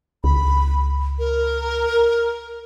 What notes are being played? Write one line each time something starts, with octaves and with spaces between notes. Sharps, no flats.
C#2 B5
A#4